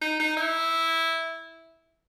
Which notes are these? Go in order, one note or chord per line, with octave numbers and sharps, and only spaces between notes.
D#4
D#4
E4